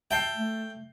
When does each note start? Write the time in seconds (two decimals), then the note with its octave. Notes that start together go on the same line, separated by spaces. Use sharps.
0.11 E5 G5 A5 C7
0.37 A3